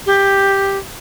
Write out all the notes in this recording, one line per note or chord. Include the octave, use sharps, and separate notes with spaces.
G4